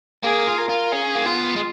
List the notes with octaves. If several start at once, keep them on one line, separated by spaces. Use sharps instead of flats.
A#3 G#4
F4
A#4
F4
C#4 G#4
A#3
B3 F4
G#3